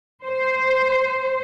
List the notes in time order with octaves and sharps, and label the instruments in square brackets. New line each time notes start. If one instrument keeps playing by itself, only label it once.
[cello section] C5